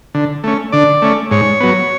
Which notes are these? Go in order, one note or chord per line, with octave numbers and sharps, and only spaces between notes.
D3
A3 C#4
D3 D5
A3 C#4
G#2 C#5
F#3 B3